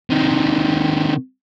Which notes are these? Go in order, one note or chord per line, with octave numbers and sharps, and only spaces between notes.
C3 D#3